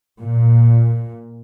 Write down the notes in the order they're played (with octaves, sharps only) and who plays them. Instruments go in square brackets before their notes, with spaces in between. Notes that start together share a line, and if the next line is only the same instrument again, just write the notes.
[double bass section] A#2